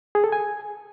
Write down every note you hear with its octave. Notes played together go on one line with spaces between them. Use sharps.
G#4
A4
G#5